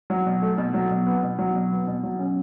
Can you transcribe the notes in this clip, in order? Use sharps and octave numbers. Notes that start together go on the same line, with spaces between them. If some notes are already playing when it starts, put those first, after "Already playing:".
F#3
B2
A3
B2
F#3
B2
B3
B2
F#3
B2
B3
B2
F#3
C#4